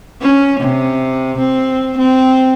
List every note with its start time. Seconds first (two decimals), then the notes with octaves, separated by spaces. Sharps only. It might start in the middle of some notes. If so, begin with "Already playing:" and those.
0.22 C#4
0.60 C3
1.39 C4
1.99 C4